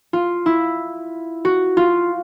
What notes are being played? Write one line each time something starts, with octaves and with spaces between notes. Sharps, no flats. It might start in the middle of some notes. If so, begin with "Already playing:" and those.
F4
E4
F#4
F4